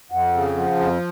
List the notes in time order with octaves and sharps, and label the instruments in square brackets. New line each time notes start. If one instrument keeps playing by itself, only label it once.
[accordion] F2 [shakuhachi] F#5
[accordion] C#3
[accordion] F3 [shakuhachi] F#5
[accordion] F2